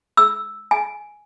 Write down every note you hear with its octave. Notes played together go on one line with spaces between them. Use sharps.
E6
G#5